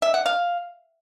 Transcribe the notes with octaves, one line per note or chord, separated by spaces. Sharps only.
E5
F#5
F5